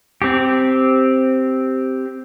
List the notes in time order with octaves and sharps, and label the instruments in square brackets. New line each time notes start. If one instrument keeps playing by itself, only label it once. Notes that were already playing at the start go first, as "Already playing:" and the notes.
[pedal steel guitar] C4 G4